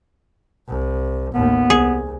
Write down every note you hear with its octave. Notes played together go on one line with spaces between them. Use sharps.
C2
A1 D#2 B3
C2 G#4